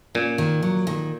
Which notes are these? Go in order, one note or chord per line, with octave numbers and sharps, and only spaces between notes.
A#2 C#4
D#3
F#3
D#3